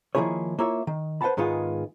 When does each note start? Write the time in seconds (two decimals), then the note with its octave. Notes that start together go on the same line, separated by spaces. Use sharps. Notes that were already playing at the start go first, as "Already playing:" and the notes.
0.15 D#3 F3 A#3 E4 G#4 C#5
0.59 A#3 E4 F4 C#5 E5
0.87 D#3
1.21 B4 C5 F5 F#5 A5 B5
1.37 G#2 D#3 G#3 B3 F4 G#4